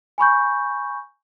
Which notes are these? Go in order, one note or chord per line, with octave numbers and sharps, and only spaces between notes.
G#5 B5 C#6 G6